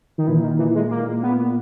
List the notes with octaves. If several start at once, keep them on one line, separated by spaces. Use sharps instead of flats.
D#3
A#2 E3
D#3
E3
G#3
A#3
B3